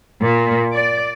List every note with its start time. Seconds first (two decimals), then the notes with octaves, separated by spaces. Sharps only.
0.22 A#2
0.73 D5